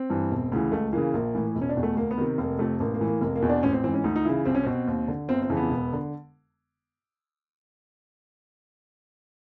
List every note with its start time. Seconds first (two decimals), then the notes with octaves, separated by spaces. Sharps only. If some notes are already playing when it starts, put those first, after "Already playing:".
Already playing: C4
0.10 G2 E3
0.31 E1
0.52 D2 C#3 E3
0.72 C#2 A3
0.93 C#3 E3 A#3
1.13 A#1 A#3
1.35 A2 E3
1.55 E1
1.62 C#4
1.69 D4
1.76 E2 B2
1.83 A3
1.97 D2 A#3
2.11 B3
2.18 C3 D#3
2.38 F1 A#3
2.59 F2 C3 A3
2.80 A1 A#3
2.94 A#3
3.01 A2 E3
3.07 A#3
3.21 F1 A#3
3.35 A#3
3.42 E2 B2
3.49 D4
3.63 A1 C#4
3.73 C4
3.84 G#2 E3 C4
3.94 C#4
4.04 D2 D#4
4.16 D#4
4.25 C#3 E3 E4
4.46 C2 C4
4.55 C#4
4.63 B2 C4
4.87 D#2
5.08 D3
5.28 G1 C4
5.42 C4
5.50 F2 C#3 E3
5.57 B3
5.70 E1
5.93 D3